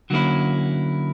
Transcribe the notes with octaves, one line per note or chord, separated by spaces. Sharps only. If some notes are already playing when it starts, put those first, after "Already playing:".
D3 F#3 A#3 C#4 E4